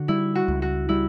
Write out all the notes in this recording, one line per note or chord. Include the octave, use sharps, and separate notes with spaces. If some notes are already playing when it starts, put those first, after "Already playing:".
Already playing: D3 F#4
G3 E4
F#4
C#2
F#4
G3 E4